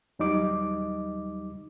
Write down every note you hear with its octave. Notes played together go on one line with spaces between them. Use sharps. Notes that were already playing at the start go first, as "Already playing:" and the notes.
D#2 F#3 G3 D#4 D#5 D6